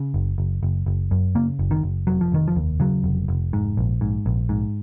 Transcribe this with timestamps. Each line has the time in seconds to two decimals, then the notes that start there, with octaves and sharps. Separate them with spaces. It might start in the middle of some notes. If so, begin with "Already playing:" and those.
Already playing: C#3
0.14 F#1
0.38 F#1
0.63 F#1
0.86 F#1
1.11 F#2
1.35 C#3 A#3
1.59 F#1
1.71 D#3
1.83 F#1
2.07 F1 F#3
2.21 F3
2.32 F1 D#3
2.48 F3
2.56 D#2
2.80 C#3 F#3
3.04 F1
3.28 F1
3.53 G#2
3.77 A#1
4.01 G#2
4.26 A#1
4.49 G#2